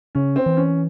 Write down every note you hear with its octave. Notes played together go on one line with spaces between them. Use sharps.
C#3 C#4
C4
E3
C#4